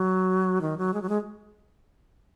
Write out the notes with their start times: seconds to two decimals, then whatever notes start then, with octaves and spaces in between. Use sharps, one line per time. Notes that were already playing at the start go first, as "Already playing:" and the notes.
Already playing: F#3
0.61 D#3
0.78 F#3
0.94 G#3
1.02 F#3
1.09 G#3